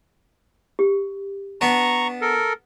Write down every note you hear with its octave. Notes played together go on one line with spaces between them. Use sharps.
G4
B3 D4 A#5 C#6
A4 A#4